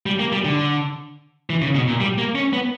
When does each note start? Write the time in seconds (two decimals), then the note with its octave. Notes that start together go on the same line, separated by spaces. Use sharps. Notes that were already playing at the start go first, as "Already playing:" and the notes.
0.06 G3
0.20 A#3
0.32 G3
0.45 D3
1.50 E3
1.62 C#3
1.75 B2
1.88 A#2
2.01 G3
2.18 A#3
2.35 C#4
2.53 B3